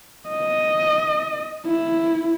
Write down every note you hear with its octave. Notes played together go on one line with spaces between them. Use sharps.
D#5
E4